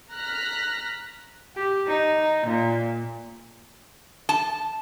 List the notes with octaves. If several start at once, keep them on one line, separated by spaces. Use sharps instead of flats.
A#5 F6 F#6 A#6 B6
G4
D#4
A#2
A5